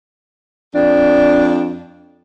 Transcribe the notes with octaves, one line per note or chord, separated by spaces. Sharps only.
F2 D4